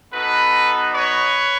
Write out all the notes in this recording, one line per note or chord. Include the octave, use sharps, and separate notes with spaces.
B3 D#4 F#4 A4 B4
B4 C#5